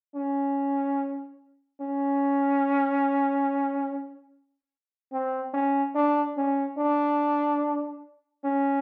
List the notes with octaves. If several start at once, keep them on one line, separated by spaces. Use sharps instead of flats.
C#4
C#4
C4
C#4
D4
C#4
D4
C#4